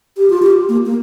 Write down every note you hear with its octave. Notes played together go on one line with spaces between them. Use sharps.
G4
F4
G4
A#3
A#3